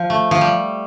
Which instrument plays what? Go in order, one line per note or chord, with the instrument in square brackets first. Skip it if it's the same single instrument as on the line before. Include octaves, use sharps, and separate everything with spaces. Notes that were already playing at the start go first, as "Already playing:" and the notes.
Already playing: [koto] F3
A3
F3
G3